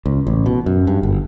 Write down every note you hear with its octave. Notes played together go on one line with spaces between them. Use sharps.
C#2
A1
B2
F#2
G2
G1